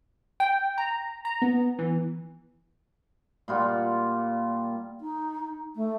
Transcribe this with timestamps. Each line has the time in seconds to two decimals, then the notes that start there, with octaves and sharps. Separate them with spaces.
0.40 G5
0.78 A#5
1.25 A#5
1.42 B3
1.79 E3
3.48 A#2 G3 F4 F#5
5.01 D#4
5.76 A3